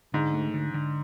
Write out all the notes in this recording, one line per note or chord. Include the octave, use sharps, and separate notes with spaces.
G#2 D3
A3
D3
D3